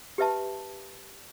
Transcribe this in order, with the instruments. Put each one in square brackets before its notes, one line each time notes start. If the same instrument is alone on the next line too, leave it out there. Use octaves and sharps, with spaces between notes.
[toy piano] G4 B4 E5 A5